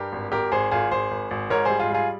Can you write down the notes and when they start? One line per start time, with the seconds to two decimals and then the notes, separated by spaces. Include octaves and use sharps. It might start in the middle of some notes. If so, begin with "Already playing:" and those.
Already playing: G2 G4 A#4
0.12 G#1
0.32 G#1 G4 A#4
0.52 G#1 G#4 C5
0.71 G#1 F4 G#4
0.91 G#1 G#4 C5
1.11 G#1
1.31 G#1
1.50 G#2 A#4 C#5
1.65 G3 G#4 C5
1.80 F4 G#4
1.90 G3 F4 G#4